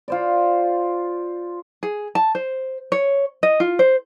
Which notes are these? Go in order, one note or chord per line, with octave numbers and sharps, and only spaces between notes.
F4 C5 D5
G#4
A5
C5
C#5
D#5
F4
C5